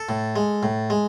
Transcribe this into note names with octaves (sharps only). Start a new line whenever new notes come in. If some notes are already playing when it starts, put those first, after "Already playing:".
Already playing: A4
A2
G#3
A2
G#3